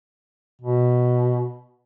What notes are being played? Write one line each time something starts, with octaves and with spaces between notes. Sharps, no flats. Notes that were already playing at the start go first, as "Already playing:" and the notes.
B2